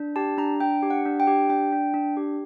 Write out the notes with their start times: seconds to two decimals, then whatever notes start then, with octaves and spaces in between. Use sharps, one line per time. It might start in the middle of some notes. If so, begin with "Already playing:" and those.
Already playing: D4
0.16 G4 A5
0.38 D4 A#5
0.60 D4 G5
0.83 G4
0.90 F#5
1.05 D4
1.20 G5
1.27 G4
1.49 D4 G5
1.72 D4
1.94 D4
2.17 G4